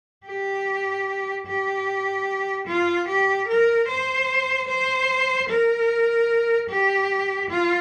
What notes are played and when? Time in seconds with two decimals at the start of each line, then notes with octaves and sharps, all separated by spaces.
0.26 G4
1.46 G4
2.67 F4
3.08 G4
3.48 A#4
3.88 C5
4.68 C5
5.49 A#4
6.70 G4
7.50 F4